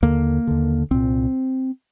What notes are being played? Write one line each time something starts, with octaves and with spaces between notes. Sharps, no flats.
D#2 D3 A#3
D#2 D3
C2 A#2 C4